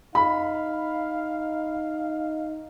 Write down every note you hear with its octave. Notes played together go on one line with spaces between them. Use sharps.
D#4 F5 B5